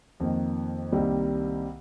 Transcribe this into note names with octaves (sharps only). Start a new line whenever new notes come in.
F2 D#3 A#3
C2 C3 D#3 G3 A#3